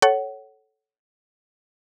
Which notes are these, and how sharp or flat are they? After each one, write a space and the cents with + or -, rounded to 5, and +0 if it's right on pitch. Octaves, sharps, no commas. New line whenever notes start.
A4 -10 C#5 +0 F#5 +25